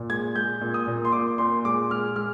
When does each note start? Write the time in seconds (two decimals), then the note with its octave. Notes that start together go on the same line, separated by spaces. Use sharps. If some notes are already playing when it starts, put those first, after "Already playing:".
Already playing: A#2
0.10 G#3 G#6
0.35 G#3 G6
0.61 A#2
0.74 D#6
0.88 A#2
1.05 C6
1.12 A#2 D6
1.38 A#2 C6
1.65 G#3 D6
1.90 G#3 F6
2.16 G#3 F6